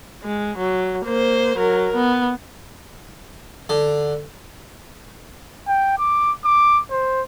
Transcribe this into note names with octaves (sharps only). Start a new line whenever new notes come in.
G#3
F#3
A#3 C5
F#3 A#4
B3
D3
G5
D6
D6
C5